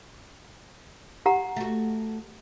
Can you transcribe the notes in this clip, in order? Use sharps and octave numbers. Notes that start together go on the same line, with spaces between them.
G4 F#5 A#5
A3 F#4